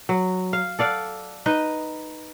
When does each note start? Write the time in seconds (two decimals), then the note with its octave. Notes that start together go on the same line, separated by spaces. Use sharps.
0.09 F#3
0.53 F5
0.79 A4 D5 F5 F#5
1.46 D#4 B4 D#5